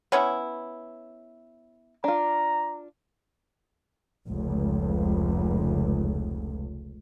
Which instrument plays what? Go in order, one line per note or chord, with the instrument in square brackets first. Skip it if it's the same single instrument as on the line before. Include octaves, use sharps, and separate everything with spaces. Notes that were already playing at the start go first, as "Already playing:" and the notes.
[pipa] B3 C#4 E4 [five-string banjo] C#5
[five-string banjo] D4 F4 [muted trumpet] A#5
[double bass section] F1 C#2